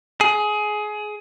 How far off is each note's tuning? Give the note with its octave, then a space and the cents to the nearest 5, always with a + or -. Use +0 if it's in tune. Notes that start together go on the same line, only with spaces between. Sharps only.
G#4 +20